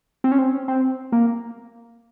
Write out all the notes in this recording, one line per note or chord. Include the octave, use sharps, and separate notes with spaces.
C4
C#4
C4
C4
A#3